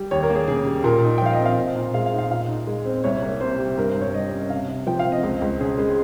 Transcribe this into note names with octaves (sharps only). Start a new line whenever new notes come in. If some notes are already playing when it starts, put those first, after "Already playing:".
Already playing: G3
D#2 C#5
A#4
A#3
G#4
C#3 G#4
G3
A#2 A#4
D#4
G5
F3 F5
D#5
C4
F5
A#2
A#2
G#3 F5
F5
D#4
F5
A#2 F5
D#4
G#3
C4
C2 C#5
A#3
C3 C5
G3
G2 A#4
C5
G2
C#5
G3 D#5
C#4
C3 F5
C3
F3 G5
F5
C4
D#5
C#2
C#2
C#3 G#4
G#3